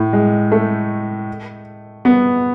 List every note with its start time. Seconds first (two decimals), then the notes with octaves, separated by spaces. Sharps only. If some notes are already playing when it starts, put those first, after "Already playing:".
Already playing: A2
0.13 G#3
0.52 A3
2.05 B3